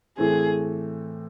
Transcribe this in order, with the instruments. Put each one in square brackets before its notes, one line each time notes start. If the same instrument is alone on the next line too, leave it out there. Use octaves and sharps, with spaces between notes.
[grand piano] A2 E3 A3 C4 [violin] G#4